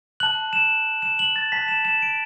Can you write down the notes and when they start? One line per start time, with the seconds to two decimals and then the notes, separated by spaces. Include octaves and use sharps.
0.20 A5 F#6 F#7
0.53 E7
1.02 E7
1.19 F#7
1.36 A6
1.52 A5 F#6 B6
1.68 E7
1.85 E7
2.02 D7